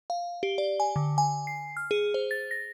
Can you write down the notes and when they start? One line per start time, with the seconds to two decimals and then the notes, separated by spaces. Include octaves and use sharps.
0.10 F5
0.43 G4
0.58 D5
0.80 G#5
0.96 D3
1.18 G#5
1.47 C7
1.77 F6
1.91 G#4
2.14 C5
2.31 A6
2.51 A#6